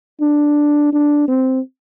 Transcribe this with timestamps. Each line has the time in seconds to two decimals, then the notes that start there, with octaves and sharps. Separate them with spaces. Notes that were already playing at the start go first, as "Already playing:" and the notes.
0.21 D4
0.93 D4
1.28 C4